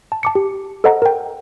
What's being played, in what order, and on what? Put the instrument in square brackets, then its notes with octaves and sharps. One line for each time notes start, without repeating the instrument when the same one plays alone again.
[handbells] A5
A5 D6 C#7
G4
A4 C5 D#5 F#5 A#5
A#4 G5